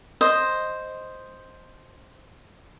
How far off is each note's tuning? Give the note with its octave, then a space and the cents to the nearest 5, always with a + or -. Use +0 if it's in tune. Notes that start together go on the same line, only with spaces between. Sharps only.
C5 +0 D#5 +0